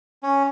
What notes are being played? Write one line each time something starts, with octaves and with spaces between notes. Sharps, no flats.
C#4